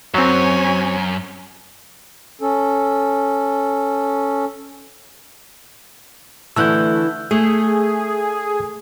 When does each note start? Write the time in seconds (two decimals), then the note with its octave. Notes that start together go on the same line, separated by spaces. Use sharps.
0.14 F#2 F#3 C4 C#5 G#5
2.41 C#4 A4
6.56 D3 E3 A3 E4 E6 F#6 G6
7.31 A3 G#4